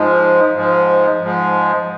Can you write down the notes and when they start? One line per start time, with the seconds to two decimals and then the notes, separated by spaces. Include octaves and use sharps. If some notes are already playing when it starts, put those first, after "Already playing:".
Already playing: G#2 F3 G#3
0.54 G#2 F3 G#3
1.19 G#2 F3 G#3